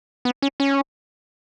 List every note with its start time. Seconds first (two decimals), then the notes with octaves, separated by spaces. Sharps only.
0.25 B3
0.42 C#4
0.60 C#4